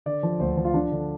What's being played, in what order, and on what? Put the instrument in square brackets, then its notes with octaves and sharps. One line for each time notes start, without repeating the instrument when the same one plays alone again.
[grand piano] D3 D5
F3
D2 C5
F3
F4
F3 D4
D3